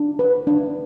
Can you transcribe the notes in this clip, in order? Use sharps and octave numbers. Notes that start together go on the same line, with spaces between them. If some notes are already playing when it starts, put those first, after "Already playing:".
Already playing: D4
B4
D4